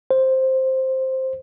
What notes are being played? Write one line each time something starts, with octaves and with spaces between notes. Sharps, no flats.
C5